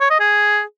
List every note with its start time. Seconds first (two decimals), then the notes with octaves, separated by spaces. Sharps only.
0.01 C#5
0.10 D#5
0.20 G#4